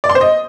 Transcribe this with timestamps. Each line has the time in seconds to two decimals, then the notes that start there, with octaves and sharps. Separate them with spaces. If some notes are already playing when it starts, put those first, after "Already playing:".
0.04 D5
0.10 C6
0.15 C5
0.21 D#5